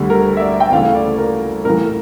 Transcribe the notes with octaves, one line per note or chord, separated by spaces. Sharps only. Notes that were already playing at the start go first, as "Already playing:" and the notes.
Already playing: D2 D3 G3
A#4
E5
D5
G5
D2 C#3 E3 A3 F5
D5
A#4
A1 A2 E3 A#4